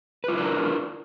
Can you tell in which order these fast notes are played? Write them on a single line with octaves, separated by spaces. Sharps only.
B4 F4 E4 D4 A#4